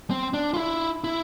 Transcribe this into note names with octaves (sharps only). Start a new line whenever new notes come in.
C4
D4
F4
E4
E4